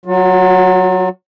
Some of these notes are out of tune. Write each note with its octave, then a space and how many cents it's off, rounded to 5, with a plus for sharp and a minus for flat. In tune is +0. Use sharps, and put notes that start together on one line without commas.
F#3 +0 F4 +40